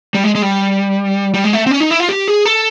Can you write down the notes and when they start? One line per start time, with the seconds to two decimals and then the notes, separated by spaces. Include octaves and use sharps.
0.14 G3
0.24 G#3
0.35 G#3
0.42 G3
1.34 G3
1.44 G#3
1.53 A3
1.67 C4
1.71 C#4
1.80 D#4
1.90 E4
2.00 F4
2.09 G4
2.28 G#4
2.46 A4